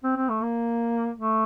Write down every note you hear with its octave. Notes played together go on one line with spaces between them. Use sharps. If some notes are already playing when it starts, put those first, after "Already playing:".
C4
C4
A3
A#3
A3